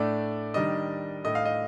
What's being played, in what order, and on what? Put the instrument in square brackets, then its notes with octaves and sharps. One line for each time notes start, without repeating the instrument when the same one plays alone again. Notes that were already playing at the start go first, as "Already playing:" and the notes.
Already playing: [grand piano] A2 A3 D4 D5
D#3 G3 D4 D#5
A2 A3 D4 D#5
F5
D#5